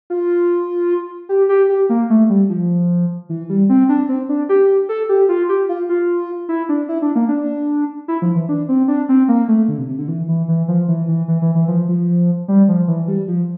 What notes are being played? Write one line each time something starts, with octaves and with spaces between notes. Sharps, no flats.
F4
G4
G4
G4
A#3
A3
G3
F3
E3
G3
C4
D4
C4
D4
G4
A4
G4
F4
G4
F4
F4
E4
D4
E4
D4
A#3
D4
E4
F3
E3
D4
C4
D4
C4
A#3
A3
D3
C3
C3
D3
E3
E3
E3
F3
E3
E3
E3
E3
E3
F3
F3
G3
F3
E3
G3
F3